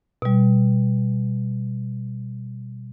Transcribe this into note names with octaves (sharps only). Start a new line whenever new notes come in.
B2 G3